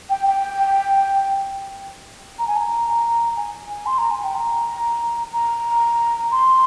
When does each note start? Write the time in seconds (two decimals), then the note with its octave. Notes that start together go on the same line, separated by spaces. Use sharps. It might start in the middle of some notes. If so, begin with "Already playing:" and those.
0.10 G5
0.27 G5
2.39 A#5
2.48 G#5
2.57 A#5
3.37 G#5
3.70 G#5
3.86 C6
3.98 A#5
4.11 G#5
4.23 G5
4.35 A#5
5.33 A#5
6.31 C6